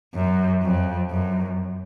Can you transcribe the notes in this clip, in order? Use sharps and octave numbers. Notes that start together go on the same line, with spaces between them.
F#2
F2
F#2